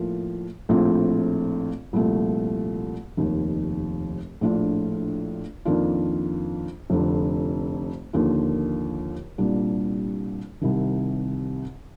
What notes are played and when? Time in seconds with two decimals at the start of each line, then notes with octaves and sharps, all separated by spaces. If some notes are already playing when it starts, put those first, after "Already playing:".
Already playing: A2 F3 A#3
0.69 A#1 A2 A3 C4 F4
1.93 C2 A#2 F3 A3
3.17 F1 D#2 D#3
4.41 A#1 A2 A3 D4 F4
5.65 F2 D#3 A#3 D4 F4
6.90 F1 F2 D3
8.13 D#2 D3 F3 A#3 F4
9.38 C2 A#2 G3 D4
10.61 C2 C3 D#3